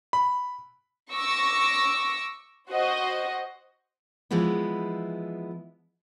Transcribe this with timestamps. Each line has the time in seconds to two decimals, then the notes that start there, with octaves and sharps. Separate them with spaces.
0.13 B5
1.13 C#6 D6 E6 A#6
2.69 F#4 C5 D#5
4.31 E3 F3 G#3 B3 E4